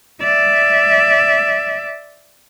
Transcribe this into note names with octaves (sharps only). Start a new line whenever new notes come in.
D5 E5